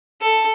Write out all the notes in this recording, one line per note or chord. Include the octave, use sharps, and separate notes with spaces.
A4